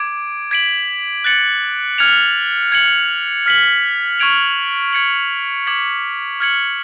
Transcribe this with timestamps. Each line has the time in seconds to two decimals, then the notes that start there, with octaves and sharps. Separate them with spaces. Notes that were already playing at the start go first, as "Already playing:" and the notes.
Already playing: D6 G#6 D7
0.51 G#6 B6 D7 F#7
1.24 F#6 A6 C#7 F#7
1.98 F6 G#6 C#7 F7
2.72 G#6 C#7 F#7
3.46 F6 B6 F#7
4.20 C#6 F6 G#6 D7 F7
4.93 G#6 C#7 F#7
5.67 D6 G#6 B6 F#7
6.40 F6 G#6 C#7 F#7